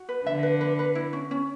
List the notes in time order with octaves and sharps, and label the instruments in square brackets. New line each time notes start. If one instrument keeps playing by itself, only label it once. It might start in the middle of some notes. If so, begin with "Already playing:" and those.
Already playing: [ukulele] F#4
B4
[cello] D3 [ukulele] E5
[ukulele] B4
B4
B4
E4
C#4
C#4